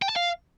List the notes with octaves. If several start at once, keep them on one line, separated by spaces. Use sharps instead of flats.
G5
A5
F5